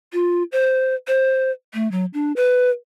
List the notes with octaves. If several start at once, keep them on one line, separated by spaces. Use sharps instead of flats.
F4
C5
C5
A3
F#3
D4
B4